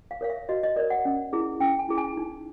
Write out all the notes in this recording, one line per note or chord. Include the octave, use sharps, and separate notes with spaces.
F5
A#4 C#5 F5
E5
F#4 D#5
D#5
A#4 C#5 D5
F#5
C#4
E4 G#4
C#4 G5
G#5
E4 G#4
G#5
D#4